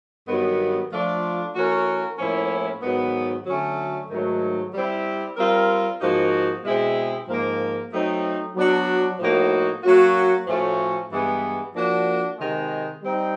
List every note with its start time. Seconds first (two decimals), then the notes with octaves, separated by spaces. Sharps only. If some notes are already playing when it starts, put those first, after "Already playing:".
0.27 G2 D#3 F#3 B3
0.91 F3 A3 D4 F4
1.54 E3 A3 C#4 F#4 A#4
2.18 A2 F3 A#3 C#4 E4
2.82 G#2 D#3 F#3 B3
3.46 D3 F#3 A3 C#4 F#4
4.10 G#2 D#3 F#3 A3
4.73 G3 C4 E4
5.37 G3 C4 F4 A#4
6.00 G#2 F3 A#3 D#4 F#4
6.64 B2 G#3 C4 E4 G#4
7.27 G#2 F3 A#3
7.91 F#3 A3 C4 D#4
8.55 F#3 B3 D4 F#4
9.19 A2 F3 A#3 D#4 F#4
9.83 F#3 A#3 C#4 F#4
10.46 A2 F3 A3 C#4 F#4
11.10 G2 E3 G#3 B3
11.73 F3 A#3 D4 F#4
12.37 C3 D#3 G#3
13.01 G3 C4 D#4